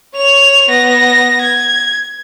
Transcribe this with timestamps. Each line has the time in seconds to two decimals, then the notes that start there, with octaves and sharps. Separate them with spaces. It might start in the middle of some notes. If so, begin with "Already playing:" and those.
0.15 C#5 F7
0.69 B3 A#6
1.41 G#6